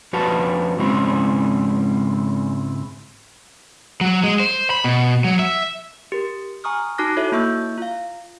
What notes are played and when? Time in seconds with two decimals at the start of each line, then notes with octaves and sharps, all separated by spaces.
0.13 F2 F#4 B4 F5 A5
0.79 G#2 C#3 G#3 C4 C#4 E4
4.01 F#3
4.24 G#3
4.40 C5
4.70 B5
4.84 B2
5.24 F#3
5.39 E5
6.12 G4 A#4
6.64 G#5 A#5 C#6 D#6 F6
6.98 D#4 F#4 A5 D6 F#6 A#6
7.17 E4 F#4 A4 C#5 E5
7.32 A#3 E4 E5 C#6 E6 G6
7.78 F4 F5